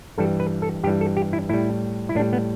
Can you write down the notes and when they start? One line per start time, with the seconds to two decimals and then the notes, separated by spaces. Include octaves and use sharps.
0.18 G2 E3 G3 A4
0.40 B4
0.62 A4
0.83 G2 G4
0.86 E3 G3
1.01 A4
1.17 G4
1.33 E4
1.49 A2 G3 E4
2.09 E4
2.15 A2 D4
2.19 G3
2.33 B3